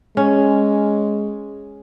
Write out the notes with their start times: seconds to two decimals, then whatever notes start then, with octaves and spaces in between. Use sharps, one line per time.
0.17 G#3 C#4